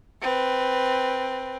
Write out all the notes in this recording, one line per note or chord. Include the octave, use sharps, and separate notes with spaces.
C4 B4